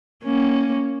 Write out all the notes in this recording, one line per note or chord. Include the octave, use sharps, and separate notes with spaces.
A#3 C#4